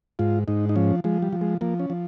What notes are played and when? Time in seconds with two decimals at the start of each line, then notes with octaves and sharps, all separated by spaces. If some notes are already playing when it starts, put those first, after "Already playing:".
0.19 G#2 F4
0.48 G#2 D#4
0.69 D#4
0.76 F3 C#4
1.04 F3 G#3
1.22 G3
1.33 F3
1.41 G#3
1.61 F3 A#3
1.80 C#4
1.90 F3